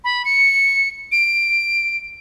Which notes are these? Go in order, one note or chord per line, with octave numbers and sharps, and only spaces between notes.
B5
C#7
D7